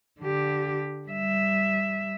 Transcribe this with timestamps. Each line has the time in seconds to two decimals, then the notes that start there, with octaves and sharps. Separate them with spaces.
0.20 D3 G4
1.09 G3 E5